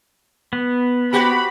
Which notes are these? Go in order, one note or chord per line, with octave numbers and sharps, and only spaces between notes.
B3
F#4 G4 C5 B5